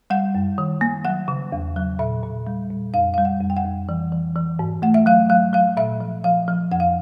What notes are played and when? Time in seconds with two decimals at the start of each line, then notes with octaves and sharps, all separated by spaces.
0.10 G3 F#5
0.35 F#2
0.58 D#3
0.81 A#3
1.05 F#3 F#5
1.28 C#3
1.52 E2
1.76 F#3
1.99 A#2 E5
2.23 A#2
2.47 G3
2.70 A#2
2.94 F2 F5
3.14 G3 F5
3.25 F#5
3.41 F2
3.50 G5
3.57 F#5
3.64 F2
3.89 E3
4.12 E3
4.36 E3
4.59 G#2
4.82 A3 F#5
4.94 E5
5.06 F#3 F5
5.30 F#3 F5
5.53 F#3 F5
5.77 A#2 E5
6.00 F3
6.24 F3 F5
6.48 F3
6.72 F2 F#5
6.80 F5